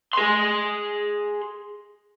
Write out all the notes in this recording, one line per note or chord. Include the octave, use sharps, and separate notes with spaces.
G#4 C6